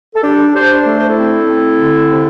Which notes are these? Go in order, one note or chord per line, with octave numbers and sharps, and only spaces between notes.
A4
D4 G4
D4 G4 C5
A3 A4
C5
E4 A4
C4
C4
D3
C3